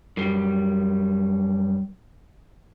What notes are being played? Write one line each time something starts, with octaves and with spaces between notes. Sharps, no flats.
F#2 G3